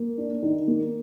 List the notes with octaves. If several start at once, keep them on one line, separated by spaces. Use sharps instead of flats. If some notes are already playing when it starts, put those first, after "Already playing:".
Already playing: A#3
D4
D#3
A#3